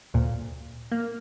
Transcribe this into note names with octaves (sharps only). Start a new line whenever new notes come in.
D2 A#2
A#3